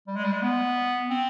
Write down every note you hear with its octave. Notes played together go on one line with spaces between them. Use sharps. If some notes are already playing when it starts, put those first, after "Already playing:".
G3
G#3
G3
G#3
B3
C4